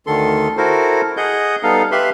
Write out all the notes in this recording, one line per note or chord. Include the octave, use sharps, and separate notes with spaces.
D2 D3 D#3 A4 C6
E4 F#4 A4 A#4 C5
G#4 D#5 F#5 G6
G3 B3 D#4 A4 F5
G4 B4 E5 F5 B5 C6